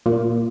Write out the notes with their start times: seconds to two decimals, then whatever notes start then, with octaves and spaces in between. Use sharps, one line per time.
0.06 A#2